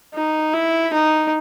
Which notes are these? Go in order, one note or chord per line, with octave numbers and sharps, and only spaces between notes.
D#4
E4
D#4